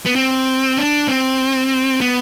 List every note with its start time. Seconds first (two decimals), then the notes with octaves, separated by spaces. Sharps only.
0.06 B3
0.16 C4
0.78 D4
1.08 C4
2.01 B3